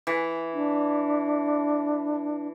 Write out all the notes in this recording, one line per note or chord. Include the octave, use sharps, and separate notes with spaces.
E3
D4